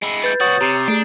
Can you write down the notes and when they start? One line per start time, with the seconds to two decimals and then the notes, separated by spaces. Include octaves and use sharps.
0.02 G#3 E4
0.24 B4 G6 A6
0.40 C2 F#4 C#5 D#6 G6 A6
0.61 C3 G4 A#5 C7
0.88 A3 D4 G#4